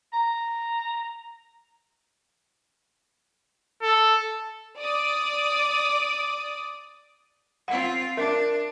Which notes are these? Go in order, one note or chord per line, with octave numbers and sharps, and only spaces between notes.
A#5
A4
D5 D6 D#6
C4 F4 F#5
D4 A#4 E5